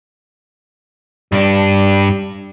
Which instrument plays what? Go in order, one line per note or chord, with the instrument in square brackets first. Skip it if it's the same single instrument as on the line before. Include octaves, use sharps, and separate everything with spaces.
[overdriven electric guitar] G2 D4 [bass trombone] G3